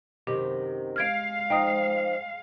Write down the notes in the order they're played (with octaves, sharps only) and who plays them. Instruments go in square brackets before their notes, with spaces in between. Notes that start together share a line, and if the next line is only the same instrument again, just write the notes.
[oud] F#2 C3 D#3 [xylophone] G4
[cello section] G#3 F5 [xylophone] F6 G#6 D7
[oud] F3 D#4 [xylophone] G5 D#6